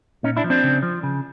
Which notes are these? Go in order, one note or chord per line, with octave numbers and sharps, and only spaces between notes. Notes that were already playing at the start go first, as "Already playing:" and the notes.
A#2 C#4 D#4
D4 E4
F3
C4 D4
C#3
F3
C#3